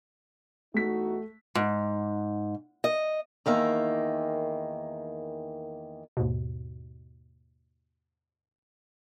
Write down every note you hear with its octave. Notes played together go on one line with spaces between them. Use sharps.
E2 A3 D#4 F#4 B6
G#2
D#5
E2 D#3 A#3 E5
D#2 G#2 B2